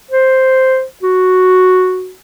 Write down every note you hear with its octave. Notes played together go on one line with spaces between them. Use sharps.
C5
F#4